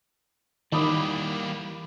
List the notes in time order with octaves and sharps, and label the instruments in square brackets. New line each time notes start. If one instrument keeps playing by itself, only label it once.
[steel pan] D#3 [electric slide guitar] E3 [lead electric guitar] G3 A#3 [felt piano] B5 D6 D#6